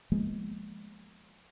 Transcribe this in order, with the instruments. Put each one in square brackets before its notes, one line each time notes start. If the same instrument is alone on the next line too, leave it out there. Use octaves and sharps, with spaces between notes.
[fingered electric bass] F3 G#3 A#3 B3